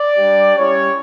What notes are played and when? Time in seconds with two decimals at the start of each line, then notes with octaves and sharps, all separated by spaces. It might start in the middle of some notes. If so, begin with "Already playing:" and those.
Already playing: D5
0.17 G3 D4 G4
0.57 G3 C#4 E4 G4 C#5